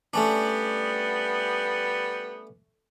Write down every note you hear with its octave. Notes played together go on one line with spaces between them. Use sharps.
G3 A3 B3 C#4 D4